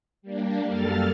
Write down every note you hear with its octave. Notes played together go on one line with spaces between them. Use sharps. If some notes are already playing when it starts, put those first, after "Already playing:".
G3 A#3 D4
F#2 G3 A#3 A4 F6 A6